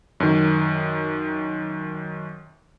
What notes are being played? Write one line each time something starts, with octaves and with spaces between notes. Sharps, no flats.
F#2 D#3